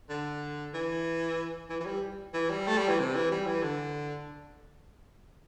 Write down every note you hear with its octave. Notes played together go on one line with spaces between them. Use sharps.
D3
E3
E3
E3
G3
E3
G3
A3
G3
E3
C3
E3
G3
E3
D3